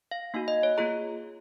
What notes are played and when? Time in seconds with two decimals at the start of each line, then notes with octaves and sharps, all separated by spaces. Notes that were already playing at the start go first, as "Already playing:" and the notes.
0.11 F5
0.34 A#3 D#4 F#4 F5
0.48 D#5
0.63 C#5
0.77 A#3 F4 G#4 A#5